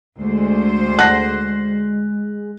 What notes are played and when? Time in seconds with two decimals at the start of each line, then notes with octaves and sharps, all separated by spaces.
0.19 D2 G#3 C5
0.99 F#5 A5 F#6 A#6